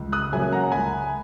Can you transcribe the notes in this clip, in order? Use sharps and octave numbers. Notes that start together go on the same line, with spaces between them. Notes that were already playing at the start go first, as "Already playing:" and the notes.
Already playing: C#2
D#6 F#6
C#3 F#3 A#3 E5 G#5
F#5 A#5
C#2 G#5 B5